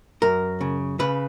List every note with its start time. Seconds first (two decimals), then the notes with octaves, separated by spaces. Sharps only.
0.22 F#2 A#4
0.61 C#3
0.99 C#3 B4